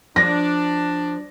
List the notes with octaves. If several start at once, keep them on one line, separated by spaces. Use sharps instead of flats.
F3 D4 A#6